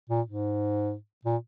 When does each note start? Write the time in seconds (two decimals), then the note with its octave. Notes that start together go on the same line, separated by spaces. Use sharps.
0.10 A#2
0.26 G#2
1.25 A#2